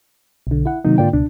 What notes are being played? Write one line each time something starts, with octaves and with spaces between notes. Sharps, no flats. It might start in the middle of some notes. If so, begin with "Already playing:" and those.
B1 D3
E4 F#5
C3 D#3 F#3 A#3 D#4
G#2 D3 A#3 F4 D5 G5
C#2 B2 D4